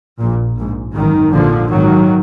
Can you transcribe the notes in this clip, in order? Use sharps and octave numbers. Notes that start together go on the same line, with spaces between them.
A#1 A#2
A#1 G#2
G#1 F#2 D#3
A#1 A#2 D3 F3
G#1 G#2 D#3 F#3